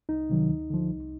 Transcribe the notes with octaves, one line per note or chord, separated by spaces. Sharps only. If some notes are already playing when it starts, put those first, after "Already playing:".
C2 D#4
C3 D#3 F#3
D2
D3 F3
C2